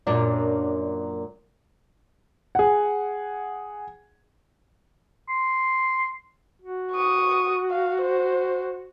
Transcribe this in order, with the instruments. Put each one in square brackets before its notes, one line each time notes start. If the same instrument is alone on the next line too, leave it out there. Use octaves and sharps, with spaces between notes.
[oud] F#2 A#2 D4
[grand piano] G#4 F#5
[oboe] C6
[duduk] F#4
[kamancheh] C#6 D#6
F5
C5